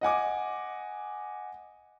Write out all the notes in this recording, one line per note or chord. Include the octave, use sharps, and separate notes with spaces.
D#5 F#5 G#5 D6